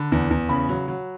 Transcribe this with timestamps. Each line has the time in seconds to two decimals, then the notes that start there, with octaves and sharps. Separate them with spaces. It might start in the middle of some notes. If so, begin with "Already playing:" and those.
Already playing: D3 B5
0.12 E2
0.31 E2
0.49 C#3 B5
0.69 F#3
0.88 F#3